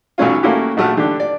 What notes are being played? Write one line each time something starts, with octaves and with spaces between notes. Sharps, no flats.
B1 F#3 C#4 F4
A3 A#3 C#4 E4 F#4 G4
A#1 F#3 A3 A4 F#5 F6
D3 D4 G4
D5